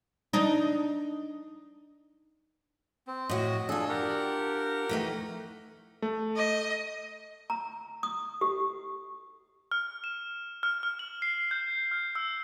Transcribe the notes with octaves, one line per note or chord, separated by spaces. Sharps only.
D4 D#4
C4
A2 F#4 D#5
D4 F4 G#4 A4
G4 A#4 F#5
E3 A3 D#4
A3
D#5
A#5
D#6
G4
F6
E7
F6
F6
F#7
C7
G6
F6
E6